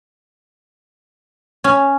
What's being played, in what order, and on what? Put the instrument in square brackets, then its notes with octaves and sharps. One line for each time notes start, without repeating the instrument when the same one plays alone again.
[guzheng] C#4